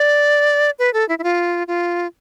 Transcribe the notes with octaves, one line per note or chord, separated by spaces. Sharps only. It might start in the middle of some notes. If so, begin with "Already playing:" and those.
Already playing: D5
B4
A4
E4
E4
F4
F4